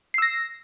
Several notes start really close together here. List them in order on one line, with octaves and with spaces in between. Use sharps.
C7 E6 A#6